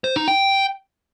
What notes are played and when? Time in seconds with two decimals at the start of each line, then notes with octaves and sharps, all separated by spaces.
0.04 C5
0.16 D#4
0.28 G5